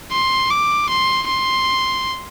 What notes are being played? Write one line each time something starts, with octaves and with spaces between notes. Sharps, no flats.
C6
D6
C6
C6